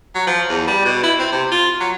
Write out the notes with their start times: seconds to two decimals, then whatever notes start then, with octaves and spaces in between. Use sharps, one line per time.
0.15 F#3
0.27 F3
0.50 E2
0.68 G3
0.85 B2
1.03 E4
1.19 C4
1.32 C3
1.51 F4
1.81 F#3